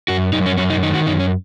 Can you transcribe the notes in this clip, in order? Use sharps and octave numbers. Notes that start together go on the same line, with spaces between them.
F#2 F#4
F#2 D#4
C#4
F#2 C#4
D#4
D#3 D#4
F#4
F#2 D#4
C#4